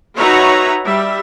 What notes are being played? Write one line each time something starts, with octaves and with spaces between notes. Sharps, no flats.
D#4 F#4 B4 C#5 E5 A#5
G3 E5